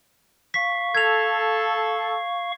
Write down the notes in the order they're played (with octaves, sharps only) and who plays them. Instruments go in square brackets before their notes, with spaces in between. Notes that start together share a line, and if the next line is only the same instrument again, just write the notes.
[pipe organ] F5 C#6 [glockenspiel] B6
[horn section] A4 [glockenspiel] G#6 F7